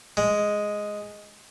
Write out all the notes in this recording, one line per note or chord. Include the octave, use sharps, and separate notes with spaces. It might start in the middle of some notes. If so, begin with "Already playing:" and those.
G#3